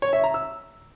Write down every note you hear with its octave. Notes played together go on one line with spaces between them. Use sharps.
C#5
E5
A#5
E6